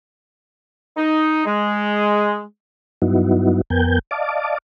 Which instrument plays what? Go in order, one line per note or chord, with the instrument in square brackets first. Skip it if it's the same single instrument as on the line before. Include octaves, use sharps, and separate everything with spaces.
[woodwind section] D#4
G#3
[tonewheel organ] G2 F#3 B3 D#4 E4 F#4
F2 B3 A#4 G5 G#5 G6
D5 D#5 F5 A5 D6